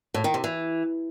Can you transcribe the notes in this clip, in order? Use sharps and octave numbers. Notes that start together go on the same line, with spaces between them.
A2
D#3
C3
E3